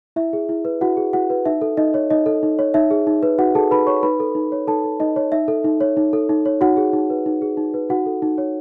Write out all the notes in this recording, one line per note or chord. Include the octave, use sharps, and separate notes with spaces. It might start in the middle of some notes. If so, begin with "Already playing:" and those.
E4 E5
G#4
E4
B4
E4 F#4 F#5
G#4
E4 F#4 F#5
B4
D#4 E5
A4
D#4 D#5
C#5
D#4 D#5
A4
D#4
C#5
D#4 E5
G#4
D#4
B4
D#4 F#4 F#5
G#4 A4 A5
D#4 B4 B5
B4 C#5 C#6
D#4 B4 B5
A4
D#4
C#5
D#4 A4 A5
A4
D#4 D#5
C#5
D#4 E5
A4
D#4
C#5
D#4
A4
D#4
C#5
D#4 F#4 F#5
G#4
D#4
B4
D#4
G#4
D#4
B4
D#4 F#4 F#5
A4
D#4
C#5